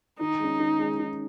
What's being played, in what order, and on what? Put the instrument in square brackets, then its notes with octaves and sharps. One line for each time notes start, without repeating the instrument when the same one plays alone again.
[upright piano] D#3 [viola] D#4
[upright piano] G#3 C#4
D#3
G#3 C#4
D#3